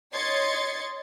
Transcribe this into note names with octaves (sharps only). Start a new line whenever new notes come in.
C#5 D#5 C6 G#6 A6 C#7